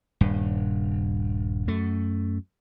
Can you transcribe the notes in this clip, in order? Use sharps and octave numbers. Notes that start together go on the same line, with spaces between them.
D#1 G2
F#2 A3